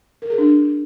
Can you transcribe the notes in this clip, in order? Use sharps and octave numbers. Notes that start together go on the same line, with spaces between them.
A#4
G#4
D4